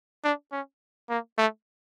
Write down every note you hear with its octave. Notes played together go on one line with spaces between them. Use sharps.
D4
C#4
A#3
A3